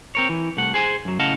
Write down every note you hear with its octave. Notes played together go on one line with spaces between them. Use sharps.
C4 A#4 C#5
E3
C2 A3 F#5
G#4 C5 G#5
F#2 F#3
A2 C#3 D#5 F5 F#5 A5